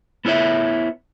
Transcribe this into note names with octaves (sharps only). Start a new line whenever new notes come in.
B3 E4 F4 C#5 E5